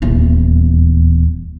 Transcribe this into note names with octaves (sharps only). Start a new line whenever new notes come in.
D#1 E2